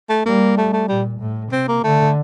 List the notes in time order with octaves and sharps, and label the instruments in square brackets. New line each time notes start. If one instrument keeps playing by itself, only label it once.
[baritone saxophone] A3
[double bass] G3 [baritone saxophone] A#3
[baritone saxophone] A3
A3
[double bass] A#2 [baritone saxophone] G3
[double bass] A2
[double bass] C3 [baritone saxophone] C4
[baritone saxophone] A#3
[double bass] D3 [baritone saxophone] A3